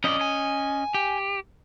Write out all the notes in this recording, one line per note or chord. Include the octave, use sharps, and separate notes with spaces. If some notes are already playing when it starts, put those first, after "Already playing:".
F2 C#4 D5 D#5
G#5
G4